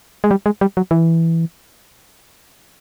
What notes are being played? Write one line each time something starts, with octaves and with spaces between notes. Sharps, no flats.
G#3
G3
G#3
G3
F#3
E3